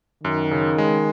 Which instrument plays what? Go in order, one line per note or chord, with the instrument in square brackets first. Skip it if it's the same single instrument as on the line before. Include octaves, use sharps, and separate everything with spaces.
[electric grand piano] F#2 [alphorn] D#3
[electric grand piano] C#3
G#3